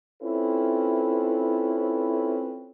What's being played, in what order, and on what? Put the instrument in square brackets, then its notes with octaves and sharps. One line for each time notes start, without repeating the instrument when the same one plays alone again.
[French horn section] C4 C#4 E4 F4 A4 B4